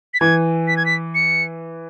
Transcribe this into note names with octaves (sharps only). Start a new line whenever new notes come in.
B6
E3 G#6
B6
G#6
B6
C#7